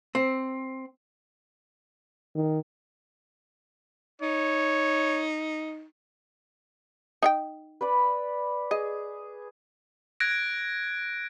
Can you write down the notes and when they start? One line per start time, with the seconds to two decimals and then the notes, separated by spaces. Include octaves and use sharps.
0.15 C4
2.35 D#3
4.22 D#4 C#5
7.23 D#4 F5 G5
7.81 B4 D5 B5
8.71 G#4 D#5
10.20 F#6 G#6 A#6 D7